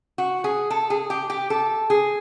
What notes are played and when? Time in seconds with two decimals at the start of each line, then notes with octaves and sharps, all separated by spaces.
0.18 F#4
0.44 G#4
0.70 A4
0.90 G#4
1.10 G4
1.30 G4
1.50 A4
1.90 G#4